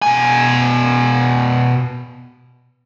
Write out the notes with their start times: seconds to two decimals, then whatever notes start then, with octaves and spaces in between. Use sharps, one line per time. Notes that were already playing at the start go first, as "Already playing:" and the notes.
0.02 B2 G#5